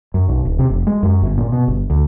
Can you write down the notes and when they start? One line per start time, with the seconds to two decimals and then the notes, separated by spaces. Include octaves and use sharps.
0.14 F#2
0.29 B1
0.45 D#1
0.59 C3
0.70 F1
0.87 G#3
1.03 F#2
1.22 G1
1.38 A#2
1.52 B2
1.68 G1
1.90 D2